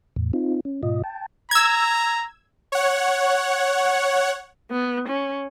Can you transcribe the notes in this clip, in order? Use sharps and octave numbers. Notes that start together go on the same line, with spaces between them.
E2 A2
C4 D#4 F4
C#4
G#2 B2 F4 D#5
G5 A5
A#5 E6 G#6
C#5 F#5
B3
C#4